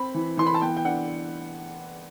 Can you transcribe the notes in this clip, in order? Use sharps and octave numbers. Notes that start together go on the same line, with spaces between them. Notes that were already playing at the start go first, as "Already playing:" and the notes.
Already playing: C4 B5
E3
E3 C6
B5
A5
B3 G5
G5
D4 F#5